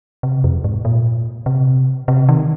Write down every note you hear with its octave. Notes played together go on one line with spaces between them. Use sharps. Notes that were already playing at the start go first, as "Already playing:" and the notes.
C3
F2
G#2
A#2
C3
C3
D#3